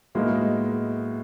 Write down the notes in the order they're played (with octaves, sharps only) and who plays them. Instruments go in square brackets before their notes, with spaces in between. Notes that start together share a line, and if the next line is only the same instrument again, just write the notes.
[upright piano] A2 F#3 B3 D#4 [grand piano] G#3 A#3